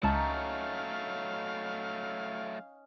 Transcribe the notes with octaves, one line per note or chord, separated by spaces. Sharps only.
C#2 F#3 A3 C#4 D#4 F5 A5 A#5